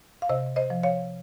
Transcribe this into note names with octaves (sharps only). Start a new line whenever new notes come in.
F5
C3 C5 D#5
C5 D#5
F3
C#5 F5